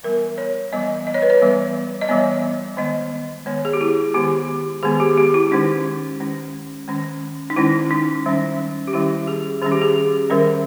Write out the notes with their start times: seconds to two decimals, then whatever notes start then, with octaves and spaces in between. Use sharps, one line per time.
0.04 E3 G3 B3 A#4
0.38 C#5
0.73 E3 G3 B3 D#5
1.07 D#5
1.14 C#5
1.22 B4
1.30 C#5
1.41 E3 G3 B3
2.01 D#5
2.09 E3 G3 B3 C#5
2.77 D#3 G#3 B3 D#5
3.46 D#3 G#3 B3 C#5
3.65 G#4
3.73 G4
3.81 E4
4.14 D#3 G#3 B3 G4
4.83 D#3 G#3 B3 G#4
5.00 G4
5.17 G4
5.34 E4
5.51 D#3 G#3 C#4 D#4
6.20 D#3 G#3 C#4
6.88 D#3 G#3 C#4
7.50 D#4
7.56 D#3 G#3 C#4 E4
7.91 D#4
8.26 D#3 G3 C#4
8.87 G4
8.93 D#3 G3 C#4 E4
9.27 G#4
9.61 D#3 G3 C#4 G#4
9.72 G4
9.82 G#4
10.30 D#3 G3 C#4 A#4